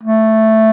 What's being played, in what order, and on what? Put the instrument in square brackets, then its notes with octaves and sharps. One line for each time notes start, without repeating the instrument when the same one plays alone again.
[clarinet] A3